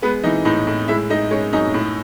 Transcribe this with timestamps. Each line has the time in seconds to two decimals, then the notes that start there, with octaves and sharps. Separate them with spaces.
0.02 G#3 B3 B4
0.23 E3 D#4 D#5
0.45 A2 D#4 D#5
0.67 A2
0.88 G#3 E4 E5
1.10 G#3 D#4 D#5
1.31 G#3 C#4 C#5
1.53 F#2 D#4 D#5
1.74 A2